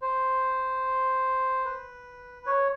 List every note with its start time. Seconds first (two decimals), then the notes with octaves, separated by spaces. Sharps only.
0.02 C5
1.65 B4
2.46 C#5